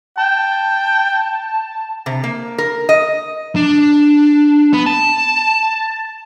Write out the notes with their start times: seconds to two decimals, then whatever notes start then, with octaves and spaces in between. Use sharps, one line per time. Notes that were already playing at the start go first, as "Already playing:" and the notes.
0.17 G5 A5
2.06 C3
2.24 A#3
2.58 A#4
2.89 D#5
3.56 D4
4.73 B3
4.86 A5